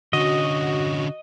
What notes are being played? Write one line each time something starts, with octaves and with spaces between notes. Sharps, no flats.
D3 C#4 F#4 D#5